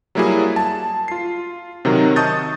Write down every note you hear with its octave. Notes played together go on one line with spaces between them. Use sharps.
F#3 G3 A#3 E4 F#4 G#4
A5
F4 C7
C3 D#3 F#3 D#4 F#4 A#4
D#5 A5 C#6 D#6 G6 A6